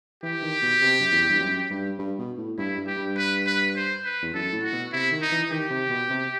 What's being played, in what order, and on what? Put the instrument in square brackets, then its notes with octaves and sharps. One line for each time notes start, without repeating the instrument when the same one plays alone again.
[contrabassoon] E3 [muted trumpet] G4
[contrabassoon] D#3
B2
C3
F#2
E2
G2
F#2
G2
G2
B2
A2
[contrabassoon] G2 [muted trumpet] E4
[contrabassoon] G2
[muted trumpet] G4
[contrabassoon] G2
[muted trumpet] B4
B4
C5
B4
[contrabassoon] E2
[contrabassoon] F#2 [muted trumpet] A4
[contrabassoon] A2
[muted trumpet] F#4
[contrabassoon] B2
[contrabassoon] C3 [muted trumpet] E4
[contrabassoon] D#3
[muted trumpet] D#4
[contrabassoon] E3
[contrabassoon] D#3 [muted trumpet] G4
[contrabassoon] C3
B2
C3